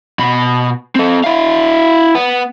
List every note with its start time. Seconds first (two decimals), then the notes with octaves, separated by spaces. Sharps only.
0.19 B2 B5
0.96 C4 A4
1.24 E4 F5
2.15 B3